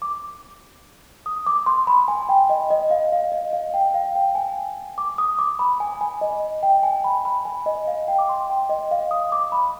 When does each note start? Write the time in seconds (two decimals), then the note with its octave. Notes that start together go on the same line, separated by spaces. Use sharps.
0.02 D6
1.26 D#6
1.46 D6
1.66 C6
1.87 B5
2.08 G#5
2.29 G5
2.50 D#5
2.70 D#5
2.91 F5
3.12 F5
3.32 D#5
3.53 F5
3.74 G5
3.94 F5
4.15 G5
4.35 G#5
4.98 D6
5.18 D#6
5.39 D6
5.59 B5
5.80 G#5
6.01 G#5
6.21 D#5
6.63 G5
6.83 G#5
7.04 B5
7.25 B5
7.45 G#5
7.66 D#5
7.87 F5
8.08 G5
8.19 D6
8.29 C6
8.50 G5
8.69 D#5
8.91 F5
9.11 D#6
9.32 D6
9.52 B5